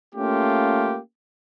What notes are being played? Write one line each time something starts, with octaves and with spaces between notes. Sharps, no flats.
A3 A#3 C#4 F4 G4